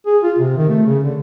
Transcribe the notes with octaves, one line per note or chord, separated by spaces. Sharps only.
G#4
F4
C3
D#3
A3
C#3
D3